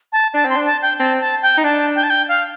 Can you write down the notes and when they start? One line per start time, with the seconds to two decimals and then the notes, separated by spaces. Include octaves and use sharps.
0.13 A5
0.34 D4 A5
0.45 C4 C6
0.57 D4
0.66 A5
0.82 G5
0.99 C4 A5
1.20 A5
1.42 G5
1.57 D#4
1.64 D4 A5
1.95 G5
2.04 A5
2.10 G5
2.29 F5